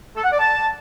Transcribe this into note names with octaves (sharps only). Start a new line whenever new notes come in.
A4
F#5
D5
A5